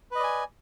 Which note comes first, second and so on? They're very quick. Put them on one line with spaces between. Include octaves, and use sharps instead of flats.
B4 D#5 D5 G#5